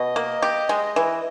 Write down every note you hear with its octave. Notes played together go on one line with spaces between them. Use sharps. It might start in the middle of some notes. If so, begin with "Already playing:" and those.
Already playing: B2 D#5
A#3
G4
G#3
E3